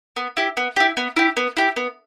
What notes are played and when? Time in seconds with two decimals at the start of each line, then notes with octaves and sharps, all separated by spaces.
0.16 B3
0.37 E4 G4
0.57 B3
0.76 E4 G4
0.97 B3
1.16 E4 G4
1.37 B3
1.57 E4 G4
1.76 B3